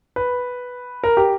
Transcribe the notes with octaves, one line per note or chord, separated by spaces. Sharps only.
B4
A#4
G4